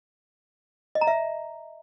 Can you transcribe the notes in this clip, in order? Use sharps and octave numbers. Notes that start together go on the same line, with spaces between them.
D#5
A#5
E5